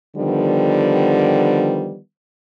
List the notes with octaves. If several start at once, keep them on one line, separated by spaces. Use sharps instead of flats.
D3 D#3 F3 G3 B3